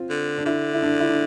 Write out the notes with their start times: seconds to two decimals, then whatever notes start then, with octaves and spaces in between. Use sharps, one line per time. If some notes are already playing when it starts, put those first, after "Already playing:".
Already playing: C4 F4
0.10 D3
0.38 D4
0.45 D3 E4
0.74 E4
0.83 D4
1.00 E4
1.09 D4